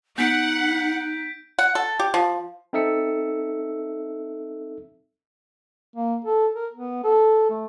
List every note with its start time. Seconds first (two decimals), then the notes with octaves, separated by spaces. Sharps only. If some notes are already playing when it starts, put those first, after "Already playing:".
0.18 B3 D#4 F#5 G6 B6 D7
1.59 F#5
1.75 A4
2.00 G4
2.14 F3
2.73 C4 D#4 A4 E5 E6 C#7
5.96 A#3
6.25 A4
6.55 A#4
6.73 B3
7.04 A4
7.50 A3